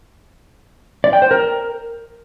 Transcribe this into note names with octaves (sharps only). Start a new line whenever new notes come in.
D5
G5
C5
A#4